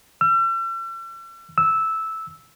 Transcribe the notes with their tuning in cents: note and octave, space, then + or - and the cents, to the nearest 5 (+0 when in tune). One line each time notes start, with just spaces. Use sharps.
E6 +40
E6 -10